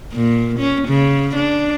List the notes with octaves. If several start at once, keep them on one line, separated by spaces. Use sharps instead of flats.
A#2
C#4
C#3
D4